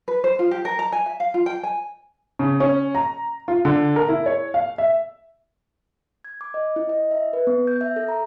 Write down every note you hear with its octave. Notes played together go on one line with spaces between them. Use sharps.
B4
C5
F4
G4
A#4
A#5
G#5
E5
F5
F4
G5
G#5
C#3
C#4
A#5
F4
D3
A#4
E4
C#5
F5
E5
G#6
D6
D#5
E4
D#5
E5
B4
B3
G6
E5
A4
A#5